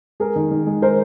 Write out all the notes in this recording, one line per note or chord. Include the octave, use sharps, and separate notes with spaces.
G#3 G#4 A#4
D#3
D#3
G#3
G#3 A#4 C5